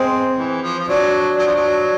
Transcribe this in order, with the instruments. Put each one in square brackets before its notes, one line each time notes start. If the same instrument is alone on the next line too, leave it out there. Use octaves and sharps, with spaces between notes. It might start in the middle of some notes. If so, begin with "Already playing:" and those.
Already playing: [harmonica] G#3 [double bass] C4
[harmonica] E3
F3
F3
[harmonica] F#3 [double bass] D4
[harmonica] F#3 [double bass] D4
[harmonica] F3
F#3